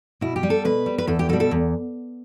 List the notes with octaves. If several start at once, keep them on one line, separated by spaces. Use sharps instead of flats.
B2 E4
G4
G3
A4
B2 B4
G3
B4
E2 A4
G4
B2 G3 A4
A4
E2